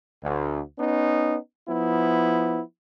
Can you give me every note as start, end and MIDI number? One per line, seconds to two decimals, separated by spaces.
0.23 0.61 38
0.78 1.36 59
0.78 1.36 61
0.78 1.36 63
1.68 2.61 53
1.68 2.61 59
1.68 2.61 64